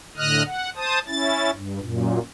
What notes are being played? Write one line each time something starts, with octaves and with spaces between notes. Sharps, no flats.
A2 D3 D#5 D#6 F6 F#6
F#5
C5 A5 D#6
C#4 E4 A6
G2
F#2 A#2